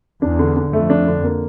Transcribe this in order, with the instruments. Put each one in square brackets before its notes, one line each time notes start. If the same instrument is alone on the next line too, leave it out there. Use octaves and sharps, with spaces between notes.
[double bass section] E2 [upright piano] D4
[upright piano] D3
D3
[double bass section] F2 [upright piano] A3
[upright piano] D4
D3
A#3